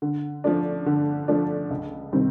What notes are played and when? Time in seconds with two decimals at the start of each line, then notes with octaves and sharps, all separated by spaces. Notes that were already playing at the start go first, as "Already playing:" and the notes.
0.02 D3
0.44 F3 A3 D4
0.86 D3
1.28 F3 A3 D4
1.70 C#2
2.12 C3 D#3 G3 C4